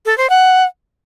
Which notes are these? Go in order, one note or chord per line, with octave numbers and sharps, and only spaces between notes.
A4
C5
F#5